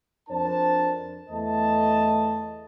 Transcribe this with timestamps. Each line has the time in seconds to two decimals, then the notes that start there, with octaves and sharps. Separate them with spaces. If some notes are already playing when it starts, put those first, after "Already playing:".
0.29 F2 D4 A#4 C5 A5
1.30 E2 A3 D#5 A5